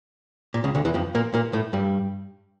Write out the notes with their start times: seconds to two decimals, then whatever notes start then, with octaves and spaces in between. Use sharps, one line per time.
0.54 A#2
0.64 C#2 C#3
0.75 D2 D3
0.85 E2 E3
0.94 F2 F3
1.15 A#2 A#3
1.34 A#2 A#3
1.53 A2 A3
1.73 G2 G3